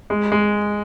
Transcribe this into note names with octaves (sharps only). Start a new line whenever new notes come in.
G#3
G#3